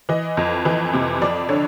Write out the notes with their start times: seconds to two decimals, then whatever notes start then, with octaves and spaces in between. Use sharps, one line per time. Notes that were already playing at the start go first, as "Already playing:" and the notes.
0.09 E3 D#5
0.37 F2
0.65 E3
0.93 C3
1.22 F2 D5
1.49 D3 C#5